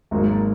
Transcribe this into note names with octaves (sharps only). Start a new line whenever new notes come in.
G#1 G#2 F#3 A#3